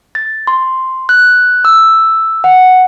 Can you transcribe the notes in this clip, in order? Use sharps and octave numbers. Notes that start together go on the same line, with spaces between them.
A6
C6
F#6
E6
F#5